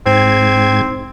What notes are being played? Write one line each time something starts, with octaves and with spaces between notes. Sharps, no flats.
G#2 C4 G#6